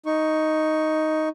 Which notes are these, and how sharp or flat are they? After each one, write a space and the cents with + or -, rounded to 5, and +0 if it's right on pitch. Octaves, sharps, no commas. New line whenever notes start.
D#4 +5 C#6 +0